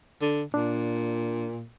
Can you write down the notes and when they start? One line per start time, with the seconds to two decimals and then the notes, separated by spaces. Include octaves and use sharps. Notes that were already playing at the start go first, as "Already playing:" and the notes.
0.21 D3
0.54 A#2 D4